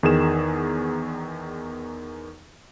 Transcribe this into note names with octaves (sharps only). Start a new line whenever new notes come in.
E2 D#3 G#4 E7